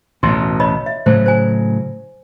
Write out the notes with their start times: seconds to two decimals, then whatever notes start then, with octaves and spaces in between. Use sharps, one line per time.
0.23 A1 D2 B2 C6
0.60 C#5 D#5 B5
0.86 E5
1.06 A2 C#3 F#3 C5
1.26 C5 G#5